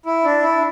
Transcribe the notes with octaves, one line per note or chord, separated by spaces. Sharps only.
E4
D4
E4